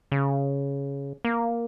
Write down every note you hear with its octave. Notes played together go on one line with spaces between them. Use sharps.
C#3
A#3